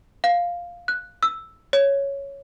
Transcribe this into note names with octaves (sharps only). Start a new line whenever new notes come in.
F5
F#6
E6
C#5